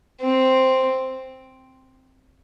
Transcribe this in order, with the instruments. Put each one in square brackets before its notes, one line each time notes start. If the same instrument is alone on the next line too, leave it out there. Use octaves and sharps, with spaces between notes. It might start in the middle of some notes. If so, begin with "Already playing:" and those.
[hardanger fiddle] C4